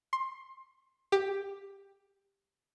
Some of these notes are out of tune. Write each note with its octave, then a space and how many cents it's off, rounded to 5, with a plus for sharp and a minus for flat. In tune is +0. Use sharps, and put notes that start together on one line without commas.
C6 +20
G4 +10